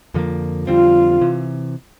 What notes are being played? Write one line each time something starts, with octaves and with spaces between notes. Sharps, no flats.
F2 D3 F3 A#3
F2 D3 G3 C4 F4
C3 E3